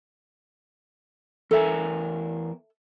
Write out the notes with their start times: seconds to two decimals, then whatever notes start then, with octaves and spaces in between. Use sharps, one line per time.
1.51 E2 A4 A#4 E5 G#5